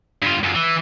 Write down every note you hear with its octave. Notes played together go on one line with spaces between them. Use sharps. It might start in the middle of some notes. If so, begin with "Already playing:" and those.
G2 F4
F#2 F4
E3